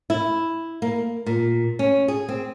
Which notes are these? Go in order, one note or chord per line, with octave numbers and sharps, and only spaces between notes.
E4
A#3
A#2
C#4
G#4
C4